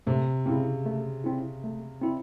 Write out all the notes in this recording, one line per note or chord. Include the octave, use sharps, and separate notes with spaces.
C3 A3
C#3 C4 E4
A3
C4 E4
A3
C4 E4